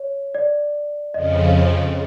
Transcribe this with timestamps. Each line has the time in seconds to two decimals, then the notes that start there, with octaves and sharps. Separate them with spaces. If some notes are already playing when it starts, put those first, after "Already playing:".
Already playing: C#5
0.35 D5
1.14 F2 C#3 F3 D#5